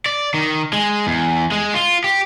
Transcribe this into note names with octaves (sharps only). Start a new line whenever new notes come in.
D5
D#3
G#3
E2
G#3
F4
G4